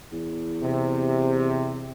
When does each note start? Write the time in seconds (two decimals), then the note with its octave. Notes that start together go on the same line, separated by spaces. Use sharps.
0.12 E2
0.63 C3